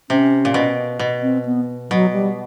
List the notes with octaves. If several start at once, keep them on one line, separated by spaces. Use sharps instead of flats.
C3 C#4
A#2
B2
B2
C4
B3
B2 F#3
G3